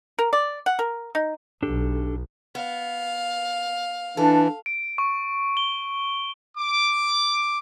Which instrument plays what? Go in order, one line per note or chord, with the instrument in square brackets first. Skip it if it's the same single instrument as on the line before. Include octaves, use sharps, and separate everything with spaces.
[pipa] A#4
D5
F#5
A#4
D#4
[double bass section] B1 [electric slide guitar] D4 G4 A4
[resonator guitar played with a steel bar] B3 [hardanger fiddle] F5
[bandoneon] E3 [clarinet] D4 [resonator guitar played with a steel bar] A4
[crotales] D7
C#6
G7
[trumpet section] D6